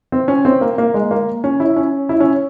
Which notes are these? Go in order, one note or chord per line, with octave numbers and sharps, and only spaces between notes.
C4
C#4
C4
A#3
A#3
G#3
A#3
C#4
E4
C#4
E4
C#4